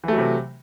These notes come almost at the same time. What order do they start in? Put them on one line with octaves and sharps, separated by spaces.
E3 A3 F#3 C3